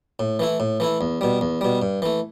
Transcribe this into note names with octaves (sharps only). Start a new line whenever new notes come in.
A2
E3 A3 E4
A2
E3 A3 E4
E2
B2 G3
E2
B2 G3
G2
E3 A3